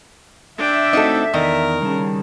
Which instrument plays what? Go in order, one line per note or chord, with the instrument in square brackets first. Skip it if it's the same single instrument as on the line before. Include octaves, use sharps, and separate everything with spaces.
[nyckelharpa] D4 G5 [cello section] E5
[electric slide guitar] A3 C4 [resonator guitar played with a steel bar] D#4 F#4 A4
[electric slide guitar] E2 B3 D5 [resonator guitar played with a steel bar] D#3 [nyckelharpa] A#4
[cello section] C#3 [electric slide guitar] G3 A5